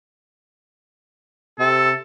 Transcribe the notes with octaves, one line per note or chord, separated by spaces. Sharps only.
C3 A4